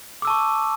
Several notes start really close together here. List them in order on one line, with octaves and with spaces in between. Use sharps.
D6 E6 A5 C#6